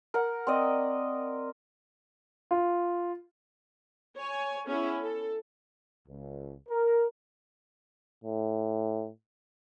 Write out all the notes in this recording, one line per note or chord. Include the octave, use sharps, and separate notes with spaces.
A#4 F#5
C4 D5 D#5
F4
C#5 G#5
B3 C#4 E4 G#4
A4
C#2
A#4
A2